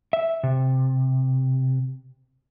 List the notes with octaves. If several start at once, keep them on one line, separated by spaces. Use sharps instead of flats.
E5
C3